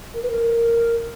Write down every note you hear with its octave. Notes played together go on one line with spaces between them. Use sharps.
A#4
B4
A#4